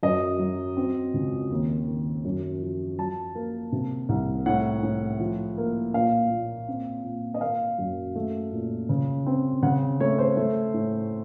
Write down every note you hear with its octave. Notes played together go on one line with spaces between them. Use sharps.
F#2 D#5
F#3
C4
C#2
D#2
D#3
F#2
F3
F#3 A5
A#3
C3
C2
A2 F#5
A2
F3
A#3
A#2 F5
A#2
C4
A#2
D#5
A#3 F5
F#2
A3
A#2
C#3
C4
C#3 F#5
A3 C#5
C5
A3
A2